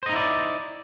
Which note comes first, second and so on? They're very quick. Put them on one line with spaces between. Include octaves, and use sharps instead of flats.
C5 D#5 D#4 E4 D5